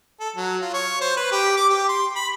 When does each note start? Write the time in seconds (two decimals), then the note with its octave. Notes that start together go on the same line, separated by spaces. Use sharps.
0.20 A4
0.36 F#3
0.62 F4
0.74 C#5
1.01 C5
1.17 B4
1.32 G4
1.57 D6
1.70 G4
1.89 C6
2.16 B5